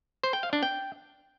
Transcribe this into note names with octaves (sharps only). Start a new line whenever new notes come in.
C5
G5
F5
D4
G5